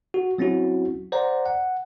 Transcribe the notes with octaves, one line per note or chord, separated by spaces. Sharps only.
F#4
F#3 C4 C#4 E4 F#4
C5 D5 F#5 A#5
F#5